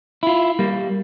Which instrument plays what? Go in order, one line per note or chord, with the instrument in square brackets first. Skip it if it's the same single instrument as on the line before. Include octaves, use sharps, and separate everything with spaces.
[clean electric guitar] E4 F4
G3 A#3